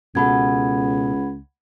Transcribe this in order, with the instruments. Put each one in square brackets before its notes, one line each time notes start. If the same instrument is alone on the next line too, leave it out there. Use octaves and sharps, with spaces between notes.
[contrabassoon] C#2 [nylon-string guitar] B2 A4 [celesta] F#5 B5 G#6